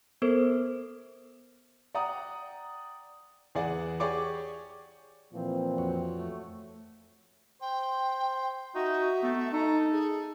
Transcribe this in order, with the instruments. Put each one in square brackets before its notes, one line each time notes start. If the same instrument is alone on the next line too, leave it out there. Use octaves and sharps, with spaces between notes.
[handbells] B3 A4 A#4 C5
[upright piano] D5 F#5 G5 A#5 D#6
E2 G#4 D5 F#5
G4 G#4 C#5 D5 C#6 D6
[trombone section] A#2 E3 F3 [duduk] C4
[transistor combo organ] F2 F#4 C#5
[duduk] A3
[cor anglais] C5 [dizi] G5
[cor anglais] D#4 [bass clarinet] F#4 [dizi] E5
[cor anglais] A3 [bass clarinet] B3
[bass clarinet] D#4 [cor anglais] A4 [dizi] A#5
[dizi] G#4